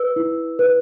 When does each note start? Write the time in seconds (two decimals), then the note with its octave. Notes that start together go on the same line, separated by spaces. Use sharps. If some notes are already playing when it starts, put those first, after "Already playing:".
Already playing: B4 E6
0.16 E4
0.59 B4